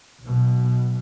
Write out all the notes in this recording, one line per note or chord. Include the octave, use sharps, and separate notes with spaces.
B1 B2